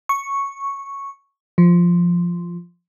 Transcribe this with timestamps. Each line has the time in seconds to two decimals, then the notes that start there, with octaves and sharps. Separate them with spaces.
0.09 C#6
1.58 F3